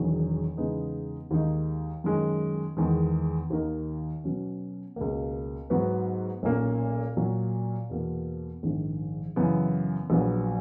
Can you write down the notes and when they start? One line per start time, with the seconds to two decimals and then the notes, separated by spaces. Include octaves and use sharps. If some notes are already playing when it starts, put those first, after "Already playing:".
Already playing: E1 E2 D#3 F#3
0.57 E2 C#3 G#3 B3 D#4
1.31 D#2 D#3 G#3 D#4
2.04 F#2 D#3 G#3
2.77 E2 D#3 G#3
3.50 D#2 D#3 A#3 D#4 A#4
4.24 B2 F#3 C#4
4.96 C#2 B2 A#3
5.70 G#2 F#3 B3 F#4 B4
6.43 B1 A#2 A#3 C#4
7.17 A#2 F#3 A#3
7.90 E2 B2 A#3
8.63 A#1 G#2 D#3
9.36 F#2 C#3 E3 B3
10.10 A#1 A#2 F#3 B3